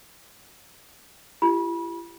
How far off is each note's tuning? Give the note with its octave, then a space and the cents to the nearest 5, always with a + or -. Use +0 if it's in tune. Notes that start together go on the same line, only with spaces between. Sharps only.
E4 +45 G4 +0 B5 -30